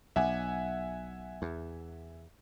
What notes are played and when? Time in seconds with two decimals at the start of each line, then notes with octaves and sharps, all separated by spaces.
0.16 B1 E5 F#5 G#5
1.42 E2